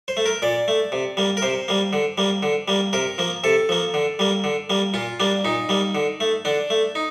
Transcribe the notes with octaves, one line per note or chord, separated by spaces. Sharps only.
C5
A3
A#4
A#2 D5
A3
C3
G3 A#3
A#4
C3 C5
G3 A#3
D3
G3 A#3
D3
G3 A#3
C3 A#4
F3 A#3
C3 A4
F3 A#3
D3
G3 A#3
D3
G3 A#3
A#2 F4
G3 A#3 D4
A#2 D#4
G3 A#3
D3
A3
D3 D4
A3
D#4